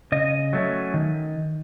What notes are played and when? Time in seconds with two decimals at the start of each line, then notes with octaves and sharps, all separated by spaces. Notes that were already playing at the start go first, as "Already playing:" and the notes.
0.12 C#3 D#5
0.53 F#3 A3 C#4
0.94 D#3